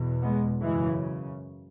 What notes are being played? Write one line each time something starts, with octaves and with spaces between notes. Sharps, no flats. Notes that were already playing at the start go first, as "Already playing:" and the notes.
Already playing: E2 B2
G#3 B3
F#2 C#3 E3 G#3